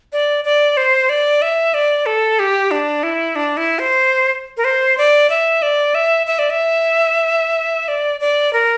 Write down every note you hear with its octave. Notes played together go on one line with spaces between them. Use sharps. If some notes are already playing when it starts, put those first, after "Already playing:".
D5
D5
C5
D5
E5
D5
A4
G4
D4
E4
D4
E4
C5
A#4
C5
D5
E5
D5
E5
E5
D5
E5
D5
D5
A#4